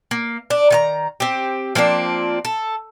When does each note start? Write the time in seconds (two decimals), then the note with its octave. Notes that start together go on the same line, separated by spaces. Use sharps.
0.11 A#3
0.50 D4
0.70 D#3 D#5 A#5
1.20 C4 G4
1.75 F3 A#3 C4 D4
2.45 A4